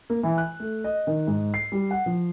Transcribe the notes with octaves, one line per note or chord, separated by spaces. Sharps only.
A#3
E3
F#6
A3
D#5
D#3
G#2
C7
G3
F#5
F3